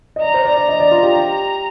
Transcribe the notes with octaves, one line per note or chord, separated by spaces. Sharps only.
D#5
D5 A#5
C5
D5
D5
D#5
D5
F4
G4